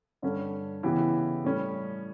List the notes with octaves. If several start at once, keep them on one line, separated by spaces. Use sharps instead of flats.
G2 D3 G3 C#4
C#3 E3 B3 E4 G4
A2 G3 C#4